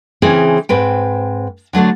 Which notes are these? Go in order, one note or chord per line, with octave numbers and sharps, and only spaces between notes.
C#3 E3 C4 C#4 E4 G#4
G#2 C4 B4 G5
D3 F#3 A3 D4